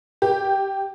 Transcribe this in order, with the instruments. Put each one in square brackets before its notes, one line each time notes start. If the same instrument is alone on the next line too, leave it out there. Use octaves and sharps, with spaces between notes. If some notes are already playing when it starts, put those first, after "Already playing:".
[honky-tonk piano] G4